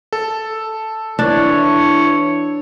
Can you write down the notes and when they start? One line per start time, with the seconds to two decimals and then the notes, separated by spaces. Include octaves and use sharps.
0.13 A4
1.19 E3 D4 E4 C#5